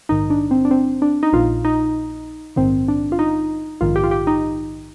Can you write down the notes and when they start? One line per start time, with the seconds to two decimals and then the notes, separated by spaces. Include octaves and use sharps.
0.09 A#1 G#2 D#3 D#4
0.30 D4
0.51 C4
0.65 D4
0.71 C4
1.02 D4
1.23 D#4
1.33 A#1 A#2 F4
1.65 D#4
2.56 A#1 G#2 D#3 C4
2.88 D4
3.12 F4
3.19 D#4
3.81 A#1 G#2 D#3 F4
3.96 G4
4.04 F4
4.11 G4
4.27 D#4